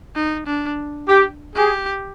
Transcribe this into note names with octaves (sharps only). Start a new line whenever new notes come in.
D#4
D4
G4
G4 G#4